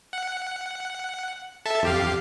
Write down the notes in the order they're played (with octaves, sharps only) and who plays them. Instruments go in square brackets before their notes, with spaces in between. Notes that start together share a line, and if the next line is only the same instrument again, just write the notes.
[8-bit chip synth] F#5
A4 E5 A5
F2 G4 F5